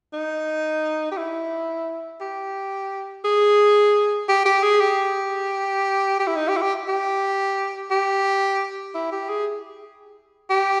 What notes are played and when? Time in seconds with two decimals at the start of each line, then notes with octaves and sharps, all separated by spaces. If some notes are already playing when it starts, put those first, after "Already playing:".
0.13 D#4
1.11 G4
1.18 E4
2.21 G4
3.25 G#4
4.29 G4
4.45 G4
4.63 G#4
4.80 G4
6.20 G4
6.27 E4
6.36 D#4
6.49 G4
6.57 E4
6.62 G4
6.88 G4
7.91 G4
8.95 E4
9.12 G4
9.29 G#4
10.50 G4